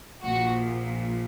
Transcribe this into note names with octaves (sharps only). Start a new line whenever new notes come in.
A#1 A#2 F3 F#4